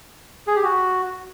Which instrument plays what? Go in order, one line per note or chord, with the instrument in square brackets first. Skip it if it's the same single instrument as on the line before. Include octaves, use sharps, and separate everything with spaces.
[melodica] G#4
G4
F#4